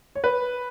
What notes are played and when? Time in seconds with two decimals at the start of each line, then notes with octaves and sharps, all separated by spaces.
0.15 C#5
0.24 B4